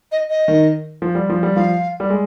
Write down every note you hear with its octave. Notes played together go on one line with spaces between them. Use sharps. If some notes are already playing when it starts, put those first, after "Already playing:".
D#5
D#5
D#3
F3
G3
F3
G3
F3 F5
G3
G#3